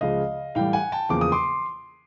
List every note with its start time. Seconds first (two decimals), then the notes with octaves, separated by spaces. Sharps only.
0.01 C#2 C#3 F3 G#3 D#5 F5
0.55 A2 E3 G3 F5 G5
0.73 F#5 G#5
0.92 G5 A5
1.09 E2 C#3 F3 A#3 D6
1.21 D#6
1.32 C6 D6